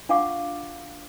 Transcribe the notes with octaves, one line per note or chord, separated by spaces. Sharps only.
D4 F4 F5 F#5 C#6 D6